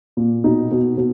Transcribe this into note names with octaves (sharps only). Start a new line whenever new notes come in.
A#2
B2 D#4
B2
B2